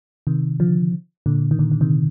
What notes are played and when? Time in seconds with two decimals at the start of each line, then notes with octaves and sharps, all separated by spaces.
0.27 C3 D#3
0.60 D3 F3
1.26 A#2 D3
1.51 D#3
1.59 A#2 D3
1.72 D3
1.81 C3 D#3